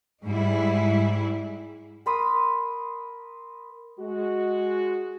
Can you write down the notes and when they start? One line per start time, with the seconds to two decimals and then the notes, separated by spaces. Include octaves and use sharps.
0.24 G#2 G3 G#3 E4
2.06 A#4 B5 C6 D#6
3.99 G#3 F#4